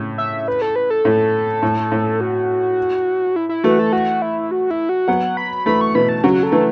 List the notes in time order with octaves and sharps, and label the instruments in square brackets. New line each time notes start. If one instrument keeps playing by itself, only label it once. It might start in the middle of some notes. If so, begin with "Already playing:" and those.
Already playing: [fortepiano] A2 C#3
[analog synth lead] E5
B4
A4
B4
A4
[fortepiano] A2
A2
A2
[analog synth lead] F#4
E4
E4
[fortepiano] E3 A3 [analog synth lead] F#4
[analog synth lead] A4
F#4
E4
F#4
E4
F#4
[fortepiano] F#3 B3 [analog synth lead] F#5
[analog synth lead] B5
[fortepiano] E3 A3 [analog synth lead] B5
[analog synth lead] C#6
[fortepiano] B2 E3 [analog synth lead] B5
[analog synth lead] A5
[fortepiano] C#3 F#3 [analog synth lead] F#4
[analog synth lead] A4
[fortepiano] E3 A3